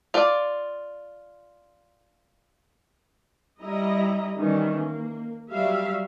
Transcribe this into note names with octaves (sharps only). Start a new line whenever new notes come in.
F4 D5
G3 E4 D#5 A#5
D#3 E3 G3 C#4
A#3
F#3 G3 E5 F5